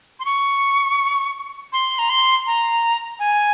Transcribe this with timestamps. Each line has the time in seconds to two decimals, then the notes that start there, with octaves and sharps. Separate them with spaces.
0.19 C6
0.25 C#6
1.73 C6
1.99 A#5
2.09 C6
2.46 A#5
3.19 G#5